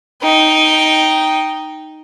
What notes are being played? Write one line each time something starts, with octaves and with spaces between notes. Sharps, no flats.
D#4 G5